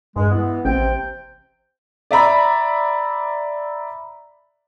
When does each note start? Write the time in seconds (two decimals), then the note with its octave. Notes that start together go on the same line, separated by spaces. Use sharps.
0.16 G2 G#3
0.31 E3 B3
0.65 A1 C3 G5
2.11 D5 E5 A#5 B5